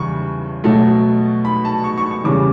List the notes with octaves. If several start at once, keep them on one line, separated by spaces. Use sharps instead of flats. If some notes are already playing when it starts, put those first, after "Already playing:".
Already playing: E2 C#3 G3 C#6
B2 F#3 A3
B5
A5
C#6
C#6
C#6
E2 C#3 G3 D6